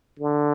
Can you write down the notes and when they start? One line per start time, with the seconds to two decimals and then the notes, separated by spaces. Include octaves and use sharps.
0.19 D3